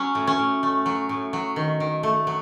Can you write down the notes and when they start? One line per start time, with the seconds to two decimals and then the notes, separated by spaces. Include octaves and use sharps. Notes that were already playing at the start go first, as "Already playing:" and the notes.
Already playing: F#3 C#4
0.15 A2
0.27 C#4
0.39 A2
0.63 A3
0.86 F#3
1.09 A2
1.33 F#3
1.56 D#3
1.80 D#3
2.03 A3
2.27 F#3